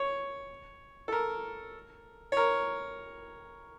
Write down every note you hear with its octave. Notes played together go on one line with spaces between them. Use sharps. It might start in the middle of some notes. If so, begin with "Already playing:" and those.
Already playing: C#5
A4
A#4
C#5
A#4